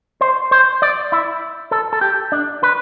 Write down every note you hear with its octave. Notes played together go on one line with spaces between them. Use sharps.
C5
C5
D5
E4
A4
A4
G4
D4
B4